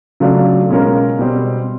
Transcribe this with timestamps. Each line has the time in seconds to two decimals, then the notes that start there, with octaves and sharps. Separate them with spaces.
0.20 C#3 F#3 A3 D4 F4
0.69 B2 G#3 C#4 F4 A#4
1.19 B2 G3 C4